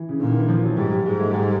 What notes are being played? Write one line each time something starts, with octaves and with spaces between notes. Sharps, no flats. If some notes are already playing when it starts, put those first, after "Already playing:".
Already playing: E3
C#3
A#2 D3
D#3
E3
F3
F#3
G#2 G3
G3
G#2 G#3
A3
G3